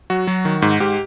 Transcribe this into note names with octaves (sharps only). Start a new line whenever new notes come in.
F#3 F#4
F#3
D#3
G#2
G#2 G4